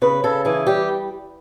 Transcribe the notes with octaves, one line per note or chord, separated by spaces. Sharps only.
C#3 B4
C#3 A4
E3 G#4
G3 G4